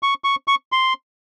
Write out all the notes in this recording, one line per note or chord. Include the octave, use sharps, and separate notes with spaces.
C#6
C#6
C#6
C6